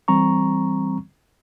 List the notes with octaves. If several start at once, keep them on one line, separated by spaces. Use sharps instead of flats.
E3 G3 C4 A#5 C#6